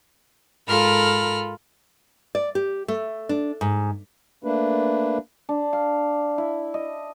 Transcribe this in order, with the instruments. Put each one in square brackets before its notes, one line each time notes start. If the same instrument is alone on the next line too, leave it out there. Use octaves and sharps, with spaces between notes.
[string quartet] G#2 F4 A4 A#4 B5 F6
[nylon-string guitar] D5
G4
A3
D4
G#2
[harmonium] A3 A#3 D4 B4
[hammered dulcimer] D4
F5
E4
D#5